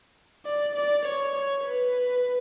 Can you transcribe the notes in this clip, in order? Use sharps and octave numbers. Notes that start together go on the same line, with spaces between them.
D5
D5
C#5
C#5
B4